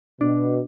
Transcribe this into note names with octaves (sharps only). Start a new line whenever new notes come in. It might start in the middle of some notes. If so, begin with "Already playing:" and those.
B2 D4